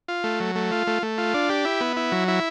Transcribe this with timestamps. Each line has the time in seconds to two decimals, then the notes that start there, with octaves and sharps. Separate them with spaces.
0.08 F4
0.24 A3
0.40 F#3
0.55 A3
0.72 F4
0.87 A3
1.03 A3
1.18 F4
1.34 D4
1.49 G4
1.65 E4
1.81 B3
1.97 E4
2.12 F#3
2.28 E4